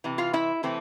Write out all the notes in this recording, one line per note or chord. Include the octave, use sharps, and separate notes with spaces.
C3 E3
F4 F5
E4 E5
C3 E3 A3 C4